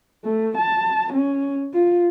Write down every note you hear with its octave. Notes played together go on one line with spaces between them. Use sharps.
A3
A5
C#4
F4